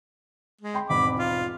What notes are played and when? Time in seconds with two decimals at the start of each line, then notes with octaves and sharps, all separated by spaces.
0.61 G#3
0.74 G5 B5 C6
0.90 E1 G#2 C4 B5 D6
1.19 F4